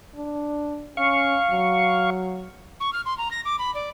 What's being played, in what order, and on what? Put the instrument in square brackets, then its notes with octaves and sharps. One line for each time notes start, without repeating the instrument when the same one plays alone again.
[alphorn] D4
[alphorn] C#4 [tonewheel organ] F5 C#6
[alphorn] F#3
[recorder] C#6
F6
C6
A#5
A#6
D6
B5
D5